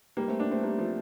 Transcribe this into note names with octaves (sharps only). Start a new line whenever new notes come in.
G3 A#3
A3 C4
A#3 D4
A3 C4
G3 A#3
F3 A3